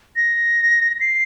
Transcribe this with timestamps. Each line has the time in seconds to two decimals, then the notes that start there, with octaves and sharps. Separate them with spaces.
0.16 A#6
1.00 C7